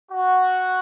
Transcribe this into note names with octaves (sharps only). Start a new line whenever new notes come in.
F#4